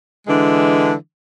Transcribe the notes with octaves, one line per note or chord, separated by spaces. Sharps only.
D3 E3 G#3 D4